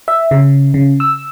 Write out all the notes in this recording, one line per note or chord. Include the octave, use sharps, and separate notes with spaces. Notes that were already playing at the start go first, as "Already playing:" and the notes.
E5
C#3
C#3
E6